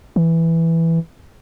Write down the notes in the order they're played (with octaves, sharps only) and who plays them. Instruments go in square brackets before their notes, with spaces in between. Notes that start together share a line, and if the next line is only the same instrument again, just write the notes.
[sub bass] E3